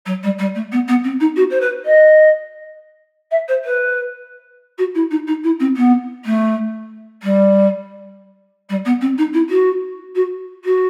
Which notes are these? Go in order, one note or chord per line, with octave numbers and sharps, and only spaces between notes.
F#3
G3
G3
A3
B3
B3
C4
D#4
F#4
C5
B4
D#5
E5
C5
B4
F#4
E4
D#4
D#4
E4
C4
B3
A3
G3
G3
B3
C4
D#4
E4
F#4
F#4
F#4